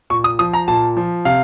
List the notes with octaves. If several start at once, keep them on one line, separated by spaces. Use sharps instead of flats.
A#2 C#6
D#6
F3 D#6
A#5
A#2 A5
F3
C3 F5